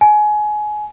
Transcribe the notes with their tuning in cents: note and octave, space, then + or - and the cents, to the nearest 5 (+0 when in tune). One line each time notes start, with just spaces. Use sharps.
G#5 +25